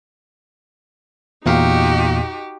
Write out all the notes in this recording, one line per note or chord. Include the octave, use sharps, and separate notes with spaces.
E2 A#2 D#4 F#4 G4 F5